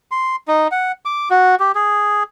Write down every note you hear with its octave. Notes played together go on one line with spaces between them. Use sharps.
C6
D#4
F#5
D6
F#4
G4
G#4